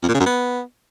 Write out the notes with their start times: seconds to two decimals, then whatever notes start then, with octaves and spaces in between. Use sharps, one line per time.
0.03 F2
0.08 A#2
0.14 C#3
0.20 F#2
0.26 B3